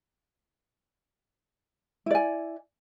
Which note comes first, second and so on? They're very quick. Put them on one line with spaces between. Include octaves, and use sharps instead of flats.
E4 D5 G#5